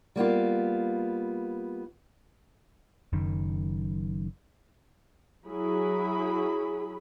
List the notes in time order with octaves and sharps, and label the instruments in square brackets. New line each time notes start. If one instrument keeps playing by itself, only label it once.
[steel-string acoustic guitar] G3 A#3 B3 F4
[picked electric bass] F#1 F#2 D#3
[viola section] F#3 E4 G#4 B5